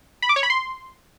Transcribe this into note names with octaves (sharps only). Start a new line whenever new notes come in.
B5
D6
C#5
B5
C6